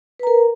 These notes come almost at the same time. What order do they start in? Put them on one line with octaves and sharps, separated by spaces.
B4 A#5 A#4